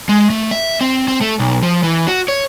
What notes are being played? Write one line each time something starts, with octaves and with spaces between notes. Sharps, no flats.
G#3
A3
E5
C4
C4
A3
B1
F3
E3
F#4
C#5